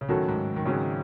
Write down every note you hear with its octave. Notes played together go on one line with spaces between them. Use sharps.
C#3
A2 D#3 F#3 C#4 F#4 A4
G#2
D#3
G#1 G#2 C#3 F#3 C#4